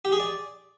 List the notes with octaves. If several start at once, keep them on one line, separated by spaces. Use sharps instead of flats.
G4
G#4
D5